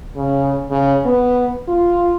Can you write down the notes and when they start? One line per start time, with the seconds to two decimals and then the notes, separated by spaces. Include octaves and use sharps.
0.17 C#3
0.71 C#3
1.05 B3
1.68 F4